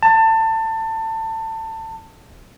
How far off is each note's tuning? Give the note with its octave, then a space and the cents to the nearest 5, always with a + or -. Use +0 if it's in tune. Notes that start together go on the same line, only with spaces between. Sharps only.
A5 +25